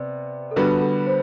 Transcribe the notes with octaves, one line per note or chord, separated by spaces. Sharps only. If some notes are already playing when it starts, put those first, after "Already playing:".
Already playing: C3 B3 B4 D5
A4
D3 G3 B3 F#4 B4
A4
C5